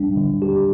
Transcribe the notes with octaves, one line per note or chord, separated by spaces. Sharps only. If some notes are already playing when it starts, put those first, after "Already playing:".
Already playing: G3 D4
D3
G4